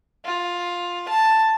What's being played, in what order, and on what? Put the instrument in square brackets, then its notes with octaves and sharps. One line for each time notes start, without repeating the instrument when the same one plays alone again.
[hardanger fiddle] F4
A5